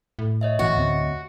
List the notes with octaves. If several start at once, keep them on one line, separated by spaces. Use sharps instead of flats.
A2
C#5 D#5 E5
G#1 E3 F#4
D2 C4